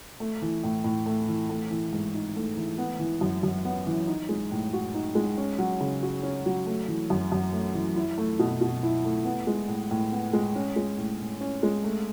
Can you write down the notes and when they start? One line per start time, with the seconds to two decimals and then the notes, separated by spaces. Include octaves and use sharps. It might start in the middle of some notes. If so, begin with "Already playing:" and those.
0.20 A3
0.42 E3
0.64 A2
0.84 A2
1.06 A3
1.28 E3
1.49 A3
1.71 E3
1.93 G#2
2.14 D#4
2.36 A3
2.57 E3
2.78 B3
3.00 E3
3.21 F#2
3.43 F#2
3.65 B3
3.87 E3
4.07 D#4
4.29 G#3
4.51 A2
4.73 F#4
4.94 D#4
5.15 G#3
5.38 C#4
5.58 F#3
5.80 C#3
6.03 F#4
6.23 C#4
6.46 F#3
6.66 A3
6.88 E3
7.10 F#2
7.32 F#2
7.53 A3
7.74 E3
7.96 E4
8.18 A3
8.39 B2
8.61 B2
8.83 E4
9.05 A3
9.25 B3
9.47 G#3
9.68 A2
9.91 A2
10.12 B3
10.33 G#3
10.56 C#4
10.76 G#3
10.98 A2
11.20 A2
11.41 C#4
11.63 G#3
11.84 A3